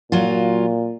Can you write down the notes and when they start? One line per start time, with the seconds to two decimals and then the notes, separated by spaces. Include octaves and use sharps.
0.12 A#2 F#3 F4